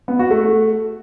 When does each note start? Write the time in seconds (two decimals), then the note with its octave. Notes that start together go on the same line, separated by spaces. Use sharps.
0.08 B3
0.19 F#4
0.31 A3